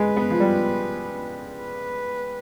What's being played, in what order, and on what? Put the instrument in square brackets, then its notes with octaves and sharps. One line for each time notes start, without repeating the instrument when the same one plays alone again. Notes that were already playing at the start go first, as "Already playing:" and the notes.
Already playing: [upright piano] G#3 [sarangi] B4
[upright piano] B3
F3
G3
[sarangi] B4